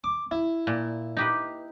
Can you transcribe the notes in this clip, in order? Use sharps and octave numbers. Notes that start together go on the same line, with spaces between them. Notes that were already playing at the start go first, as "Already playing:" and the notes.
D6
E4
A#2
D#4 G4 B4